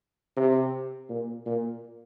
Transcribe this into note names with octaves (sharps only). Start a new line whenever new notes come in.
C3
A#2
A#2